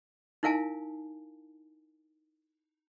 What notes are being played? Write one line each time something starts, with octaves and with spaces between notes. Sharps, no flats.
D#4 E4 A#4 F5 G#5 A5